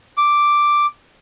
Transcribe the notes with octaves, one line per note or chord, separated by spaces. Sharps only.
D6